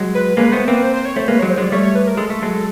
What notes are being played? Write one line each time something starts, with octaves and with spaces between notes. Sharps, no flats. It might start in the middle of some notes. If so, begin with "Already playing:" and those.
Already playing: F#3 G#3
B4
G#3 A#3 B4
A3 B3 C5
A#3 C4 B4
C5
C5
C#5
A3 C5
G#3 A#3 B4
F#3 G#3 C#5
C5
F#3 G#3 D5
G3 A3 C#5
C#5
B4
A#4
G#3 A4
A3
F#3 G#3